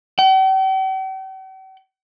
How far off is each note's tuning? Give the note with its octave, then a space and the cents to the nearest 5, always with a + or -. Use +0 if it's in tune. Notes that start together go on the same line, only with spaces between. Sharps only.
G5 -45